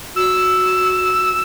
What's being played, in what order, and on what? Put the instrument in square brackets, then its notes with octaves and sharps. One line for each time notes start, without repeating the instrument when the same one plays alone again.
[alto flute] F#4 [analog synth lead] E6